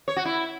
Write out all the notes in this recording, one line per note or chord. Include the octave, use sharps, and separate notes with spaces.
C#5
F#4
E4